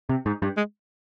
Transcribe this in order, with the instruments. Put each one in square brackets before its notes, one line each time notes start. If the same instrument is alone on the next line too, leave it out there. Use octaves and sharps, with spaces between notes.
[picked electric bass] C3
G#2
G2
[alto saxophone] G#3